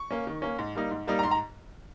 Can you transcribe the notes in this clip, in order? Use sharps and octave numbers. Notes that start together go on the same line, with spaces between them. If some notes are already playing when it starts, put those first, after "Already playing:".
Already playing: C#6
A#3 C#4
D#3
A#3 C#4
G#2
G3 A#3 D#4
G#2
G3 A#3 D#4
A#5
G#2 C6
A#5